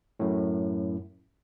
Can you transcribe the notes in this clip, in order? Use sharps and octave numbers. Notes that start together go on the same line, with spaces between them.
F#2 A2